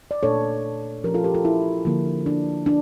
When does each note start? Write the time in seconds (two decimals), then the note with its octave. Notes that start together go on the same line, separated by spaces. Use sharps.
0.11 D5
0.23 A#2 A3 D4 A4 C#5
1.04 F3 C#4 G4 A#4
1.14 F4 A4
1.24 G4 A#4
1.34 F4 A4
1.45 E4
1.85 D3 F3 A#3
2.26 D4
2.66 D4